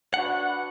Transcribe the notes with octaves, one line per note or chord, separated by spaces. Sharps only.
D4 F#4 B4 F#5